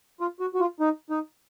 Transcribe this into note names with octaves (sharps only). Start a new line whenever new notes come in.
F4
F#4
F#4
F4
D#4
D#4